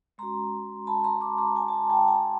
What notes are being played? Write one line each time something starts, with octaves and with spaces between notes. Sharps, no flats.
G#3 C#4 F#4 A#5 C6
A5 B5
A#5 C6
C6 D6
A#5 C6
G#5 A#5
A5
G#5 A#5
G5 A5
G#5 A#5